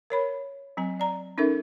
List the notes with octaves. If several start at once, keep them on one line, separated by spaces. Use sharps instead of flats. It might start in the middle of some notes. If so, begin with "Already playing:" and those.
A#4 C#5 B5
F#3 C4 G#5
D5 A#5
C#4 D#4 A4 A#4 E5